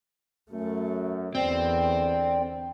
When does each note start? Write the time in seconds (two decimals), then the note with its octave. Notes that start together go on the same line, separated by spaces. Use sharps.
0.52 F#2 A3
1.35 E2 D3 C4 C5 D5 G5